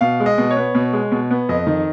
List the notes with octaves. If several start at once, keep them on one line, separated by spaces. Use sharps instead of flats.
B2 F5
G#3
D#5
B2
C#5
B3
B2
G#3
B2
B3
F2 D#5
D#3